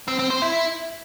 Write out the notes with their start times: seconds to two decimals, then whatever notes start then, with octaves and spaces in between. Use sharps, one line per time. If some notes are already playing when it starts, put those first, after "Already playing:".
0.08 C4
0.19 C4
0.30 C5
0.42 E4